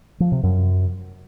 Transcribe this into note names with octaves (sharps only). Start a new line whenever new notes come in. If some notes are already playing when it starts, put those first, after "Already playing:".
F3
C3
F#2